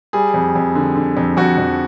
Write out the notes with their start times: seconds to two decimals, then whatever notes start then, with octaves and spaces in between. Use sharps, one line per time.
0.13 G3 G#4
0.34 F2
0.55 F2
0.75 D3
0.95 D3
1.17 F2
1.37 F2 F#4
1.58 F2